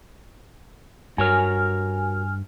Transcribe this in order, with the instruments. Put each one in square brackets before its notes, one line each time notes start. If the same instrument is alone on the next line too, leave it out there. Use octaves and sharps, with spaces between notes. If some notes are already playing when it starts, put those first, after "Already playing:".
[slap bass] G2 [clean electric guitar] F#4 A#4 C#5 [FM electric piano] G#5 F6